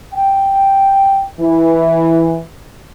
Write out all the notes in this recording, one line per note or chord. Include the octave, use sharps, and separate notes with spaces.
G5
E3